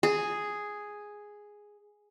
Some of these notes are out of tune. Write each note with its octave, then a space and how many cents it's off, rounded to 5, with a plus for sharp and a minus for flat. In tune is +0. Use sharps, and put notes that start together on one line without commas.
G#4 +0